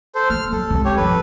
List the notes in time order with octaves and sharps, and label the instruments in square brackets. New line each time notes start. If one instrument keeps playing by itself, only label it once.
[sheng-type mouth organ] A4 C5
[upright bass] A#3 [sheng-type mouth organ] F6
[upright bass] F#3 [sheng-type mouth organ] A4
[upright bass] C2 G#3
[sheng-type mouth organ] G4 C#5
[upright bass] G2 F3 [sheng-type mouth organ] A4 B4